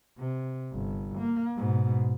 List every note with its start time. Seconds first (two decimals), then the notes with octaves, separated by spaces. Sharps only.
0.18 C3
0.73 G1
1.19 A#3
1.57 G#2 B2